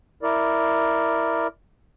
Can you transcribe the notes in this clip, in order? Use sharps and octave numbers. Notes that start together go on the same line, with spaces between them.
E4 A#4 D5